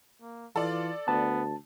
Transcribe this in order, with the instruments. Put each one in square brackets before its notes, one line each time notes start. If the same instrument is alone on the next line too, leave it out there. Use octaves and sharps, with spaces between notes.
[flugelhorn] A#3
[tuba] E3 [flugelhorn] F4 [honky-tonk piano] A4 D5
[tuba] D2 [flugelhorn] B3 [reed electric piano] A5